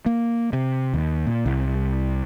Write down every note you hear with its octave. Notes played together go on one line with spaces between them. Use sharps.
A#3
C3
D#2
A#2
C2